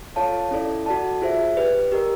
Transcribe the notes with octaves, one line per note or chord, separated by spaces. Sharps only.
F4 A4 C#5 F5 A5
C#4 E4 A4 D5
F#4 A4 D5 F#5 A5
F4 G#4 C5 E5
G4 B4 D5
G4 A#4 D#5